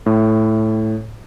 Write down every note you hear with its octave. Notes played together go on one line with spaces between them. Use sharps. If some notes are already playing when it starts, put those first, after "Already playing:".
A2